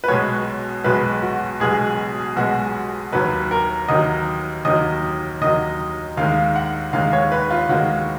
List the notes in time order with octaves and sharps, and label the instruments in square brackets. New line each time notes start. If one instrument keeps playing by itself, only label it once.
[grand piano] B4
B1 B2 G#3 C#5
B1 B2 G#3 B4
F#4
B1 B2 G#3 G#4
B1 B2 G#3 F#4
D#2 D#3 F#3 B4
A#4
D#2 D#3 F#3 D#5
D#2 D#3 F#3 D#5
D#2 D#3 F#3 D#5
D#2 D#3 G#3 F5
F#5
D#2 D#3 G#3 F5
C#5
B4
F4
D#2 D#3 G#3 F#4